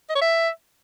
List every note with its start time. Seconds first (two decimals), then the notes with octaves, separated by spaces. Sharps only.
0.09 D#5
0.15 C#5
0.21 E5